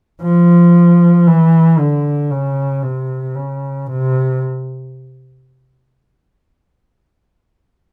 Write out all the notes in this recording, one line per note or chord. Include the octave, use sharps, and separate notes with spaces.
F3
E3
D3
C#3
C3
C#3
C3